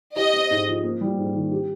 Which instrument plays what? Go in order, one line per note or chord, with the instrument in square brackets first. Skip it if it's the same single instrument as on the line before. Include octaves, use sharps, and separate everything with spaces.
[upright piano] G4 [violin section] D#5
[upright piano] C4
G#2
F3
A#3
G3
G#2
D#3
G4